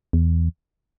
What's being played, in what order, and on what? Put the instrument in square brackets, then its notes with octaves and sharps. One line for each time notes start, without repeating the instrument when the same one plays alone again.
[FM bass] E2